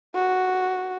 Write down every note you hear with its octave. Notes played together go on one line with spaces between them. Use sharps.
F#4